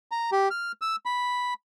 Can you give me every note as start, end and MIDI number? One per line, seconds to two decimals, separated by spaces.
0.11 0.30 82
0.32 0.49 67
0.51 0.72 89
0.81 0.96 88
1.06 1.54 83